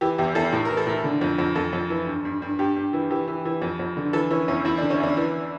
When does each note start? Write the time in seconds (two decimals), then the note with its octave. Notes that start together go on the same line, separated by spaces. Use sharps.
0.01 E3 G4
0.18 E2 G4
0.35 E2 A4
0.52 A2
0.65 A#4
0.70 E3
0.77 A4
0.87 A2 A#4
1.04 D3
1.21 F2
1.39 F2
1.55 F2 A4
1.73 F2
1.90 E3
2.07 G2
2.25 G2
2.42 G2
2.59 G2 G4
2.76 G2
2.93 E3
3.10 E3 G4
3.28 E3
3.45 E3
3.62 F2
3.80 F2
3.97 D3
4.13 E3 A4
4.30 E3 C#4
4.48 E2 C#4
4.65 E2 E4
4.78 D3 D4
4.90 C#4
5.00 E2 D4
5.17 E3